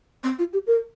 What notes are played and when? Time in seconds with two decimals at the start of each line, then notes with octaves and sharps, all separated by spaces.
0.24 C4
0.39 F4
0.53 G4
0.67 A#4